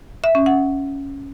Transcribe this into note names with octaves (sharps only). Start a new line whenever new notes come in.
E5
C#4
F#5